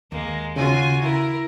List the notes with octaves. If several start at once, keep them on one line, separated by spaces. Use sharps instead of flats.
D#2 G#3 A#3
C#3 F4 F#4 G#5
E4 A#4